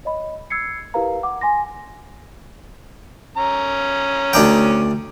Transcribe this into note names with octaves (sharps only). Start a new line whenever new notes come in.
C#5 D#5 B5
E6 G#6 C7 C#7
E4 G4 A#4 B4 F5 A#5
F#5 D6
G#5 C6 A#6
C#4 A#5
D2 D4 G5